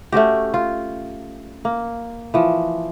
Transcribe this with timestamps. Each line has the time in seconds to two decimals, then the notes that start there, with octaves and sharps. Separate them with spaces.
0.12 A3 C#4 F#4 G4
0.54 F4
1.65 A#3
2.34 E3 F3